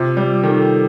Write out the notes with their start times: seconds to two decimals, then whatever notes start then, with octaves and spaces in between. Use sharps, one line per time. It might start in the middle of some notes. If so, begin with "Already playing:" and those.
Already playing: C3 F4
0.17 G3
0.43 D#3 A4